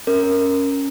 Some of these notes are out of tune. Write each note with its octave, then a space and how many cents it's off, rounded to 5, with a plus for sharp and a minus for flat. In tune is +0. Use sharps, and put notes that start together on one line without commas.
C#4 +0 A#4 +0